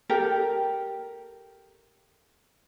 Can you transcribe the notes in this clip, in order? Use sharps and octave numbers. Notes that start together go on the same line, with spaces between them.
G4 A4 A#4